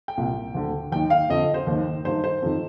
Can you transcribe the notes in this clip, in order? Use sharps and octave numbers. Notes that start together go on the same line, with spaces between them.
G5
C2 A#2
D2 D3
D#2 D#3 G5
F5
F2 D3 D#5
C5
D#2 D#3
G2 D#3 C5
C5
F2 D#3